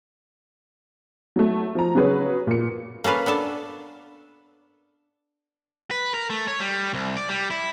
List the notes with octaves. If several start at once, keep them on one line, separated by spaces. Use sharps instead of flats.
F#3 A3
F3 A#5
C#3 F#3 F#4 G#4 B4 C#5
A#2 C#7
A#3 C#4 A4 B4 F5
B3 D4 A4 A5
B4
A#4
A3
C#5
G3
C2
D5
G3
E4